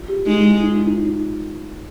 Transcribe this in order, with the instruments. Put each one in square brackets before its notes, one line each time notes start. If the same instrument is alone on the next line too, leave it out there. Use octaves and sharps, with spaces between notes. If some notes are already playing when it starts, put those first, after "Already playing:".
Already playing: [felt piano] F4
G4
[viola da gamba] G#3 [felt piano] D#4
[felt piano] F4
F4
D#4
F4
D#4
F4
D#4